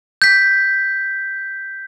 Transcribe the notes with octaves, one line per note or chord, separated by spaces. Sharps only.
G6 B6